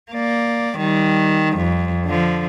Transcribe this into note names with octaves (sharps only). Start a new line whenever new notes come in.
A#3 D5
D#3 G3
F2
D3 F3